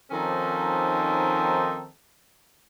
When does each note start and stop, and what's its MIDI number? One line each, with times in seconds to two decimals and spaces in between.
0.11 1.88 51
0.11 1.88 53
0.11 1.88 60
0.11 1.88 61
0.11 1.88 63
0.11 1.88 69